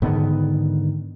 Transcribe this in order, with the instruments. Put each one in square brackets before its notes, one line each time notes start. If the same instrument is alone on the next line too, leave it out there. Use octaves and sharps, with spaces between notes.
[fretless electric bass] G#2 D3 D#3 B3